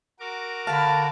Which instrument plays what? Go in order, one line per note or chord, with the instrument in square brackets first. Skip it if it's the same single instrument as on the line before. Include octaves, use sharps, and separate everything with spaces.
[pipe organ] F#4 A#4 D6
[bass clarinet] D3 [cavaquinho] F5 B5 [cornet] A5